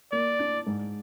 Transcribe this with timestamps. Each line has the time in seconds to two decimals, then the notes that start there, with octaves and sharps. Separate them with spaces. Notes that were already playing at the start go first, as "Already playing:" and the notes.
0.12 A#3 D5
0.39 D4
0.66 G#2